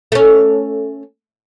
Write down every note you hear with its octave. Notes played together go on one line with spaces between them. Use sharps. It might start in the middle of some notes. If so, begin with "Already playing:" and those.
A3 C#4